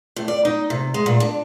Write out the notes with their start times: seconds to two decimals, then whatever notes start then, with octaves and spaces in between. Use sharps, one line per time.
0.16 A2
0.28 D5
0.45 D#4
0.70 C3
0.94 G#3
1.06 A#2
1.20 D4